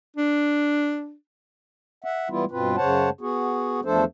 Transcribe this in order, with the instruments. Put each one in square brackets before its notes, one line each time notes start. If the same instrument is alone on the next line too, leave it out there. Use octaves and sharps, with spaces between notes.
[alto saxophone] D4
[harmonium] E5 F#5
E3 G3 B3 E4 F4
G2 B2 C4 F4 B4
F#2 C#3 C5 C#5 F#5 A5
B3 F#4 G#4
E2 F3 A3 D4 A4 C5